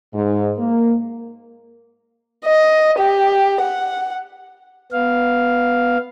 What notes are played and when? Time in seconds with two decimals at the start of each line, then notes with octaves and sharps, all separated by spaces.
0.13 G#2
0.58 A#3
2.46 D#5
2.99 G4
3.61 F#5
4.92 B3 F5